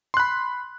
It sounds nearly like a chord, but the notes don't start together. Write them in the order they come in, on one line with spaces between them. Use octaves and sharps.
C6 F#6 B5